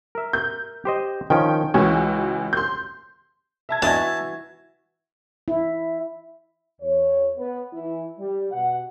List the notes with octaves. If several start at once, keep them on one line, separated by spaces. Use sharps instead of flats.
A#4 E5
G6
G4 C5 D#5
D#3 F3 C#4 G5
C#2 E3 C#4 F#4
C6 G6
E5 A5 G#6
E3 B3 D4 F#4 D#5 E5 A5 G#6
E4
E2 C#5
B3 B4
E3 E4
G3
B2 F#5